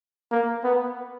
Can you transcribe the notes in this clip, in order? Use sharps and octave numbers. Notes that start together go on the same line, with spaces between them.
A#3
B3